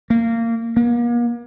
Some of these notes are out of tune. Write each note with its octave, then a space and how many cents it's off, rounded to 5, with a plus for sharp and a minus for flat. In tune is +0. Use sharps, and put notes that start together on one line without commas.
A#3 -20
A#3 +40